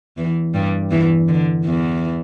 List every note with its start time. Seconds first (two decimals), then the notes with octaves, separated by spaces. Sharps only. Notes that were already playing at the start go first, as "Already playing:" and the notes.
0.18 E2 E3
0.54 G2 G3
0.91 E2 E3
1.28 D3
1.65 E2 E3